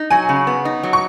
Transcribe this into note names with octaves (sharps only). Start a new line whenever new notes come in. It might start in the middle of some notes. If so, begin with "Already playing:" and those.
Already playing: D#4
F#3 G#5
C#3
B3
D#4
F#3
C#6